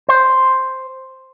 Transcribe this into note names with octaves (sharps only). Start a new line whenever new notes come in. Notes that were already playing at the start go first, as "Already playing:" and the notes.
C5